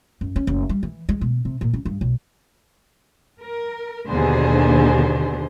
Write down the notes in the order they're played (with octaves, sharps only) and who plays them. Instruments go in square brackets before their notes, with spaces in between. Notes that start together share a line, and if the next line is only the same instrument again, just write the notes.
[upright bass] F#2
C#4
F#1
G3
E3
G#3
B2
C3
A#2
C#3
G2
B1
[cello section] A#4
D#2 B2 D3 G#4 C5